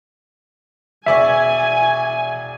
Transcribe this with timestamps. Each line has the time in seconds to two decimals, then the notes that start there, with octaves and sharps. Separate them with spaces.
1.06 E1 D5 E5 G#5 C#6